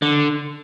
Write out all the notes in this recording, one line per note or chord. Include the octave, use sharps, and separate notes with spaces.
D3